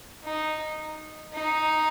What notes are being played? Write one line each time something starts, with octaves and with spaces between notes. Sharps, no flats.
D#4
D#4